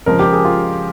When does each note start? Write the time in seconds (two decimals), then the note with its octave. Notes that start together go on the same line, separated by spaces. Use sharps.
0.06 C#3 F3 G#3 A#4
0.19 G4
0.32 G#4
0.45 F4